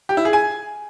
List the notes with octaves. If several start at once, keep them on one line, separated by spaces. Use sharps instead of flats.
G4
E4
G#4
G#5